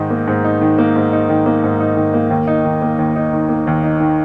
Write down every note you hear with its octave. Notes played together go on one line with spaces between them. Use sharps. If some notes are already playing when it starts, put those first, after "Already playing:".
Already playing: G#2 D#3 D#4
A#3
G#2
D#4
D#3
A#3
G#2
D#4
D#3
A#3
G#2
D#4
D#3
A#3
D#2
D#4
D#3
A#3
D#2
D#4
D#3
A#3
D#2
D#4
D#3